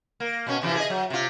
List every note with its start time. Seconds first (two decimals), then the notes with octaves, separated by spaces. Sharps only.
0.20 A#3
0.47 B2 C#4
0.62 C3 E3 F3
0.76 G#4 D#5
0.90 F#3
1.10 C3 F4